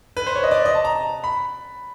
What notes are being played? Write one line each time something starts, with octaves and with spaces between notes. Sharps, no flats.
B4
C5
C#5
D#5
D5
D#5
A5
A#5
B5